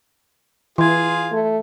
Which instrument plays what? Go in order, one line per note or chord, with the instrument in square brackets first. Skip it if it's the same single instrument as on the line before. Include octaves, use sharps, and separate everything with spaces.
[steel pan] E3 [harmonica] F4 G#4 [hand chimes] C6 G#6
[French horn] A3